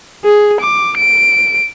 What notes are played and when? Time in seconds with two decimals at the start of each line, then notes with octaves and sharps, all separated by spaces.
0.25 G#4
0.60 D6
0.97 D7